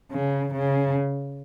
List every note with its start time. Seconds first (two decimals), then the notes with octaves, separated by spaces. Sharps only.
0.12 C#3
0.54 C#3